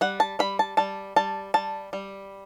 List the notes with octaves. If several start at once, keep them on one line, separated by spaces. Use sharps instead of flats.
G3 F#5
A5
G3 B5
A5
G3 A5
G3 A5
G3 A5
G3